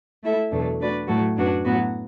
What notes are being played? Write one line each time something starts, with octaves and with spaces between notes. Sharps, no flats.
A3 E4 A4 E5
E2 B2 F#3 A3 D4
A3 D4 F#4 B4 D5
A2 F#3 A3 F#4 A4
F#2 F#3 D4 F#4 B4
A2 F#3 B3 F#4